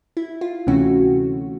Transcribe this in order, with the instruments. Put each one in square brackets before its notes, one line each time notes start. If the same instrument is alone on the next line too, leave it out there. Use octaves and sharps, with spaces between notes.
[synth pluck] E4
F4
D2 C3 E3 A3 C#4 F#4